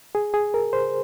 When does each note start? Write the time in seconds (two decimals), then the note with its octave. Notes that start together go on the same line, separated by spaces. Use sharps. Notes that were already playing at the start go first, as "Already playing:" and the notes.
0.15 G#4
0.34 G#4
0.54 A#4
0.73 C5